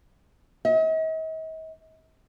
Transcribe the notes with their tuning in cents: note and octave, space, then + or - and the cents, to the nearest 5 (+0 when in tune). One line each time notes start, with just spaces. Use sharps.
D#5 +45